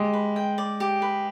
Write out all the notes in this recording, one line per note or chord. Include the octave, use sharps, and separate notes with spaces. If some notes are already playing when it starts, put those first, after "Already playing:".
Already playing: G#3 G4
B4
G5
D5
G4
B4